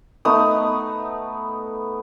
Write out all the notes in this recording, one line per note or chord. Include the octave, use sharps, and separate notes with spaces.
A3 B3 D#4 D#6